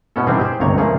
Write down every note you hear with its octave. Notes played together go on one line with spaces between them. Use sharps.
B2 B3 C#4 E4 A4
D#3 E3 G3 C4 D4 G#4
G4 G#4 C5
G1 C#2 C3 C#5 A#5
A#2 C#3 F3 A3 A#3 G#4